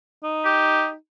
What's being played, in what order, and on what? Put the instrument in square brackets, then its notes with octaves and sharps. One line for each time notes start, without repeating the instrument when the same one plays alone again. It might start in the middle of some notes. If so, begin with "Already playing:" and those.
[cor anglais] D#4
[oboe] G4